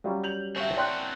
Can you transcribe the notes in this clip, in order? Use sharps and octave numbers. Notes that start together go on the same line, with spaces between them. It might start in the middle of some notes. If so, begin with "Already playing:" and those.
F#3 G3 C#4 F4
G6 F7 F#7
C4 F#4 C#5 E5
C#5 D5 G5 C6 F#6